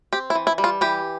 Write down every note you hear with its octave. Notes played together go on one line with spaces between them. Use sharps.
C4 G4
E4
E3
E4
G3
F4
E3 G4